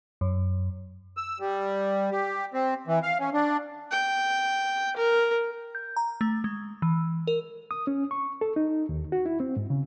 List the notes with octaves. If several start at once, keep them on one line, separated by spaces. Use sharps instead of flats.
F#2
E6
G3
G4
C4
E3
F5
C#4
D4
G5
A#4
G6
A#5
A3
G#3
E3
A#4
D#6
C#4
C#6
A4
D#4
D#2
F#4
E4
C4
G#2
C#3